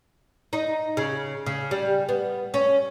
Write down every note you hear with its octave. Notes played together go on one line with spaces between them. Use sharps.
D#4
C#3
C#3
G3
B3
C#4